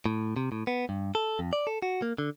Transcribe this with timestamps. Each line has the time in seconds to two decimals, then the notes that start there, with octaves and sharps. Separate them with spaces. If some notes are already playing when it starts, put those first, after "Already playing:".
0.06 A2
0.36 C3
0.52 A2
0.67 B3
0.89 G2
1.15 A4
1.39 F2
1.53 D5
1.67 A4
1.82 F#4
2.02 A#3
2.18 D3